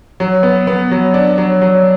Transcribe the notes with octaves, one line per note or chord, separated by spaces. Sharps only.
F#3
B3
B3
F#3
D4
F#3
F#3